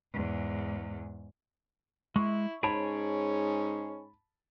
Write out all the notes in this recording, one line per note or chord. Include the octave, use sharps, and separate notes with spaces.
E2 G#2
G#3 E4 C#6
G#2 C#4 G#4 C#5 A5 B5 D7